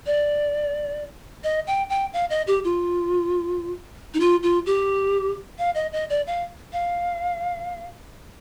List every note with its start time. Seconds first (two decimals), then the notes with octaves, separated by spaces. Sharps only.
0.06 D5
1.44 D#5
1.67 G5
1.90 G5
2.13 F5
2.30 D#5
2.47 G4
2.64 F4
4.14 D#4
4.20 F4
4.43 F4
4.66 G4
5.58 F5
5.75 D#5
5.93 D#5
6.10 D5
6.27 F5
6.73 F5